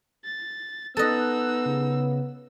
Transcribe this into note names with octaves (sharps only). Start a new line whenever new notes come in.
A6
B3 D#4 A4 D#5 E6 F#6
C#3